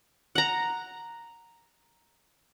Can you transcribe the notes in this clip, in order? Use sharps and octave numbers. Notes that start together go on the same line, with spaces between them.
F#5 A#5